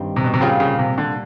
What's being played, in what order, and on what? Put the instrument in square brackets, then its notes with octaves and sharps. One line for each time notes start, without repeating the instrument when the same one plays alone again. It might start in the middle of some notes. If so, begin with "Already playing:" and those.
Already playing: [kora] G2 D#3 G3 C4
[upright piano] C3
B2
C3
[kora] A#2 G3 C4 F4 [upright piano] C#3
[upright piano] C#3
C3
D3